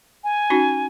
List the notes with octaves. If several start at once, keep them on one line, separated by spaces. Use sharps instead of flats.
G#5
C#4 D#4 F#4